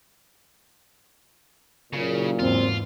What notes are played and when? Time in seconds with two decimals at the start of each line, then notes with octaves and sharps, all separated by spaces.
1.93 F#1 A#2 C#3
2.40 E2 G#2 C4 F4